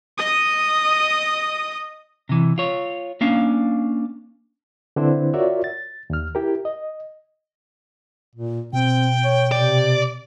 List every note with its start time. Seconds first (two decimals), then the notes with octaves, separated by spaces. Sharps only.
0.18 D#5 D#6
2.29 C3 E3
2.58 F4 C#5
3.21 A#3 C#4 D4 F5
4.96 D3 C4 D4 E4 B4 C5
5.34 F4 F#4 A#4 C#5 D5 E5
5.64 A6
6.10 D#2 F6
6.35 E4 G4 A#4
6.65 D#5
8.36 A#2
8.73 B2 C4 G5
9.24 C#5
9.52 C3 D5